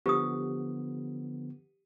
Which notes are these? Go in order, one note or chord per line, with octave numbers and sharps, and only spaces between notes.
D3 F3 B3 G4 D#6